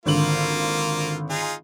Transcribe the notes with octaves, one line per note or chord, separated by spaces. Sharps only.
G#1 D3 A#3 F4 F#7
D#4 F4 G#4